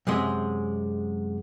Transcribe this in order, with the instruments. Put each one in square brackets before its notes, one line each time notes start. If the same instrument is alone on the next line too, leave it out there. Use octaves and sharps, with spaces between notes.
[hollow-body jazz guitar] F#2 C3 G#3